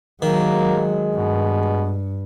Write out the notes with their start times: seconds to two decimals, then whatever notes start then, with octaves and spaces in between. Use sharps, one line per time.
0.22 D#3 F#3 G#3 A#3
1.16 G2 B2